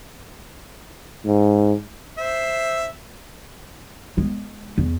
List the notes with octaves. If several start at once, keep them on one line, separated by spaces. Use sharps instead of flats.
G#2
C5 E5
G#3 B3
E2